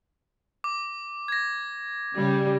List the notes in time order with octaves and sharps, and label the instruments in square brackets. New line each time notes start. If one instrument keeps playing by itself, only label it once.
[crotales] D6
G#6 A#6
[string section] C#3 G3